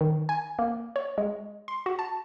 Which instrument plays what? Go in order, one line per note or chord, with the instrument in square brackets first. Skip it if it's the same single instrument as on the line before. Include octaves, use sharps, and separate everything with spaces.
[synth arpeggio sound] D#3
G#5
A#3
C#5
G#3
C6
F#4
A5